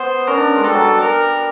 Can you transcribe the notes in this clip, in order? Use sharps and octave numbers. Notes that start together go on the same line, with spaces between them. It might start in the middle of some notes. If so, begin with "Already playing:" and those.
Already playing: B3 C5
C#4 A#4
D4
G#3
G3 A4
F#3
G3
A#4